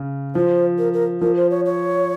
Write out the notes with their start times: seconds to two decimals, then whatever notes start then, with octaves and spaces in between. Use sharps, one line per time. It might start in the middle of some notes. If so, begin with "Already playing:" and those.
Already playing: C#3
0.35 F3 C5
0.78 A#4
0.93 A#4
1.21 F3 A#4
1.37 C5
1.50 C#5
1.65 C#5